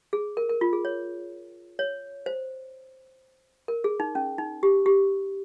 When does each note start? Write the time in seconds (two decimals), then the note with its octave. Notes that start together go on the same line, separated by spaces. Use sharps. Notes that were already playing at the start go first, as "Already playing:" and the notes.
0.13 G#4
0.37 A#4
0.49 A#4
0.61 F4
0.73 G#4
0.85 C#5
1.79 C#5
2.26 C5
3.68 A#4
3.84 G#4
4.00 D#4
4.15 C#4
4.38 D#4
4.63 G4
4.86 G4